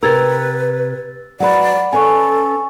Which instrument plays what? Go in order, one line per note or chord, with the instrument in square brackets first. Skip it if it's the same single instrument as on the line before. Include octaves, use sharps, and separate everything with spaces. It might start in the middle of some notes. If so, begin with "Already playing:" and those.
[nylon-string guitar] C3 G4 A#4 [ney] B4 [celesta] E6 G#6 A6
[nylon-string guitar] F#3 B4 [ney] D5 [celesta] F#5 B5
[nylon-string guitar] C#4 B4 D5 [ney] A4 [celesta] G#5 C#6